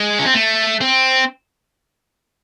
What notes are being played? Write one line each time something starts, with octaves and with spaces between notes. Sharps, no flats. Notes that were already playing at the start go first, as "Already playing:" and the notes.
Already playing: G#3
C#4
C4
A3
C4